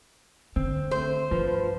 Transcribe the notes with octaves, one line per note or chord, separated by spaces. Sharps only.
D3 C4
A3 C5
G2 F3 F4 B4